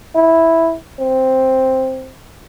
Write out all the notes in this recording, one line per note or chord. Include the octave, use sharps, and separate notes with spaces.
E4
C4